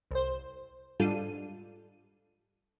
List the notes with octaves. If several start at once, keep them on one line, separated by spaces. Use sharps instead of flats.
C2 C5
G#2 G3 D4 F4 A4 D#7